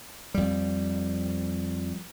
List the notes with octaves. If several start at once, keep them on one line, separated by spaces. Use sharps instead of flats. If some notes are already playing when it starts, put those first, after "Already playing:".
F2 G3